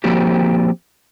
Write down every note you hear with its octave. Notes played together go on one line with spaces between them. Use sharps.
F3 A#3 C4 F#4 G4